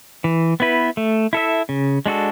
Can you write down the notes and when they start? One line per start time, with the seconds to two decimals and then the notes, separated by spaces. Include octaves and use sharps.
0.24 E3
0.60 B3 E4 B4
0.97 A3
1.33 E4 A4 E5
1.69 C#3
2.06 G#3 D4 F#4 A4